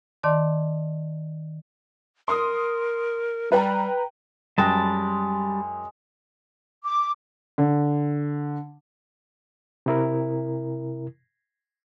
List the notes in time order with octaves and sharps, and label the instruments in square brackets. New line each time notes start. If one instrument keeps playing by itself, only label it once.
[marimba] D#3 D5 A5 C6 D6
[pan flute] A#4 [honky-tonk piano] C6 D#6
[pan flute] G3 [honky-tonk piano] B4 G5 A#5
[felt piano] F#2 G5 A#6 [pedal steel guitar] G3 A5 [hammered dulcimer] G#3
[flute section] D6
[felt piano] D3
[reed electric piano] C3 E4 A#4